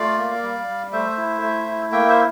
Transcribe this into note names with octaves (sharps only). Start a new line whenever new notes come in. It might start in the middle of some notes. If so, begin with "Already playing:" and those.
Already playing: A3 F4 D5 F5
A#3
G3
G3
A3 C5 E5
E4
A3
E4
A#3 E5 G5
C5 E5